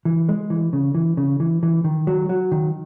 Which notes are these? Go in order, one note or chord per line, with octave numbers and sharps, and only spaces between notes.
E3
G#3
E3
C#3
E3
C#3
E3
E3
D#3
F#3
F#3
D#3